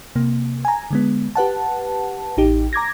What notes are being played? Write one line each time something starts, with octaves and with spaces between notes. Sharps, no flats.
C3 A#3
G#5 A#5
D3 G#3 B3
G4 B4 F#5 A5
A1 D#4 G4
A#5 D6 G#6 A#6